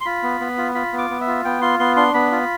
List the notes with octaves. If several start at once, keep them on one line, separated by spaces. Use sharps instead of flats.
C6
F4 B5
B3
B3
F4
F4 B5
B3
D6
B3
E5
F4
B3 G5
F4 C6
B3 C6
D4 C6
B3 B5
F4